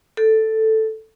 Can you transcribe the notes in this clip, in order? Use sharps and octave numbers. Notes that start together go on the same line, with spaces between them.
A4